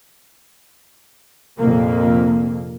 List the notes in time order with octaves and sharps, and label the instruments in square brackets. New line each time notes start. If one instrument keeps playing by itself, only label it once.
[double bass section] A#1 F2 C3 A#3